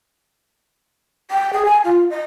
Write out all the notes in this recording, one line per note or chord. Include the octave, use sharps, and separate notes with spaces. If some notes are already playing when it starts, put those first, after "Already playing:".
G5
G#4
G#5
F4
D#5